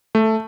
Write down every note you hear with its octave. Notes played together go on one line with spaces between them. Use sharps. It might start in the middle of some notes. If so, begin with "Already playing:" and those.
A3